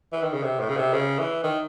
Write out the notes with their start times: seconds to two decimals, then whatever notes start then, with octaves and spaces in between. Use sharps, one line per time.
0.13 E3
0.23 D#3
0.33 C#3
0.43 C3
0.60 A2
0.69 C#3
0.77 C3
0.93 C#3
1.19 E3
1.44 D#3